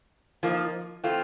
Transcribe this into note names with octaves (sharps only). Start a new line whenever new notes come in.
F3 A#3 D#4
E3 A3 C4 F4